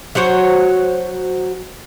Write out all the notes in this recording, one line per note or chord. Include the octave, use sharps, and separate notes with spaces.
F#3 F#4 C5 C#5